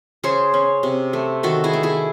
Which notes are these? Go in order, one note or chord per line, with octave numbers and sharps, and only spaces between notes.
C#3 G#4 C5
C#4
C3
A3
D#3 F#4 A4
E4 G#4
A3
E4 G#4